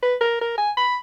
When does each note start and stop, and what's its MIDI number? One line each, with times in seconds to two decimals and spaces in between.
0.03 0.15 71
0.21 0.39 70
0.41 0.55 70
0.58 0.71 80
0.77 0.96 83